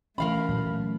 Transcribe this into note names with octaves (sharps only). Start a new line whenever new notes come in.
D3 E3 A3 C#4 A#4 F5 B5
A#2 F#3